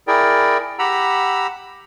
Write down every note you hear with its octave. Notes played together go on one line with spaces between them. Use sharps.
E4 G#4 A#4 D5 G5
G4 F#5 A#5 B5 E6